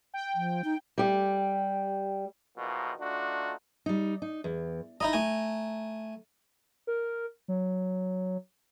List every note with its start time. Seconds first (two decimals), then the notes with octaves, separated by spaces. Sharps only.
0.14 G5
0.35 F3
0.64 D#4
0.98 G3 G4
2.58 E2 B2 D#3 F3 A#3
3.01 A3 D4 D#4 F4 F#4
3.86 G3 D#4
4.22 D#4
4.44 E2
5.01 D#4 E4 D#5 A#5
5.13 A3 G#5
6.87 A#4
7.48 F#3